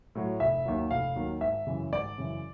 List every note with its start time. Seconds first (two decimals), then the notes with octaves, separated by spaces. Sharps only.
0.15 A2 F#3
0.40 F1 E5
0.66 D#2 D#3 F#3
0.91 F1 F5
1.16 D#2 D#3 F#3
1.41 G#1 E5
1.66 F#2 C#3 E3
1.92 G#1 D5
2.18 F#2 C#3 E3